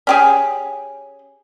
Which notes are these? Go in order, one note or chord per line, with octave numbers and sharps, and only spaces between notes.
C#4 G4 G#4